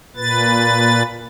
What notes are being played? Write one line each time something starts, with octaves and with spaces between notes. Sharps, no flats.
A#2 B4 A6